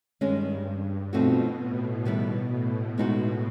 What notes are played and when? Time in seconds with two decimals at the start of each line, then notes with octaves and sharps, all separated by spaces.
0.21 G2 D#3 G#3 C#4
1.13 B2 F3 A3 C4 D#4 F#4
1.60 A2
2.05 B2 D#3 G3 B3 E4
2.52 A2
2.98 G#3 B3 D#4 F#4